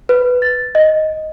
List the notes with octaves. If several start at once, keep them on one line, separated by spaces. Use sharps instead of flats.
B4
A6
D#5